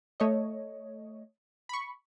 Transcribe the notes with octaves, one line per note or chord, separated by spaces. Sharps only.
A3 C#5 D#5
B5 C#6